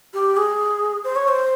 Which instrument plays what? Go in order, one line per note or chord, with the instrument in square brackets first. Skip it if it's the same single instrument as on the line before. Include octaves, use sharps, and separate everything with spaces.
[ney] G4
G#4
C5
C#5
C5